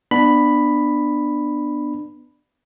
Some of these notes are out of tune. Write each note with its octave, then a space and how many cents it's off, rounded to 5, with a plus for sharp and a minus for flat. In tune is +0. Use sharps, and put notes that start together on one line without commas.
B3 +0 D4 +20 B5 +0